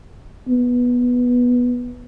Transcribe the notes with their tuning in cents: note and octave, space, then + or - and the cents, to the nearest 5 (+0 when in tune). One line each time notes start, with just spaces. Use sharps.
B3 -10